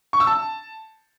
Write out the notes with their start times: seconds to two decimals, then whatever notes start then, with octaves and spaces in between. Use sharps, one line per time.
0.13 C#6
0.20 E6
0.27 A5